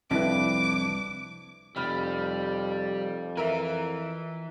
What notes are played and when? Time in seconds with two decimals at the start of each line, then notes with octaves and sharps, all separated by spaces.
0.11 C2 F2 D4 E4 B4 D6
1.76 F1 F2 G3 B5 F6
3.37 E3 A#4 E5